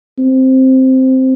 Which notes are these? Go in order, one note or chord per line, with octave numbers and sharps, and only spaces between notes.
C4